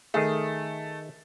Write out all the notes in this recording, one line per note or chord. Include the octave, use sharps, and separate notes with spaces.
D#3 A3 G#4 E5